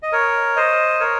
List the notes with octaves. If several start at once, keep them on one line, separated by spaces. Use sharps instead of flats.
D#5
A#4 C#5
C5 D#5
A#4 C#5